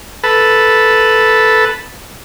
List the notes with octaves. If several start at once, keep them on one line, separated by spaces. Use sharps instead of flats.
A4 B4